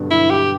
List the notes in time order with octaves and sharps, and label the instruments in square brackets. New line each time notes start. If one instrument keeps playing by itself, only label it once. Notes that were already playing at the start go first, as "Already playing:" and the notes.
Already playing: [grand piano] G2 B2 D3 F#3
[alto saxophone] E4
G4